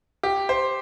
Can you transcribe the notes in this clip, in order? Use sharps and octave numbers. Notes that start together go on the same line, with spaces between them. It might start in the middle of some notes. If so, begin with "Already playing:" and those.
G4
C5